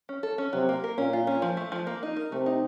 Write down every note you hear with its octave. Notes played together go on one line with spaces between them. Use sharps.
C#4
A4
C#4
C3 F#3
A#3
A#4
A#2 C#4
F4
C#4
F3
A3
F3
A#3
D#4
A#4
C3 A3
D#4